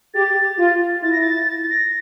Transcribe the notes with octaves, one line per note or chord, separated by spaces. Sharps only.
G4 A6
F4
E4 A6
A#6
A6
A6
A#6